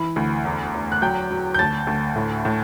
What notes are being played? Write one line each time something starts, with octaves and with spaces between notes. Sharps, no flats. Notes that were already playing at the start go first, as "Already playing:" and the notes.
Already playing: E3 B5
D2
E2
E2
F#6
F#3 G5 G6
F#3
G6
D2 A5 A6
D2
A2
A2